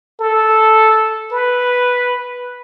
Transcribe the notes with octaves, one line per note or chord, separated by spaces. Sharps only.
A4
B4